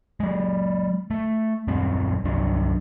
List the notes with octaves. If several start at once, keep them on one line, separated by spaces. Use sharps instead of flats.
F#3 G#3
A3
D#1 F#2 G3 C4
C2 G2 F#3 D4